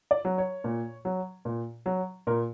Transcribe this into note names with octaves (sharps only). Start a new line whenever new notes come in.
D5
F#3
C#5
A#2
F#3
A#2
F#3
A#2 A#4